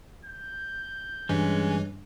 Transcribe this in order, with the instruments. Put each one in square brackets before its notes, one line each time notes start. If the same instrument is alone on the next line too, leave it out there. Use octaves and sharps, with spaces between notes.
[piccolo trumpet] G6
[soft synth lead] G2 [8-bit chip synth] E3 [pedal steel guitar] G#3 C#4